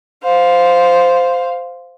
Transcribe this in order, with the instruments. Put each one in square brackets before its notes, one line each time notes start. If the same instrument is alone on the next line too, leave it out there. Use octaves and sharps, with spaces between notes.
[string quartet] C5 F5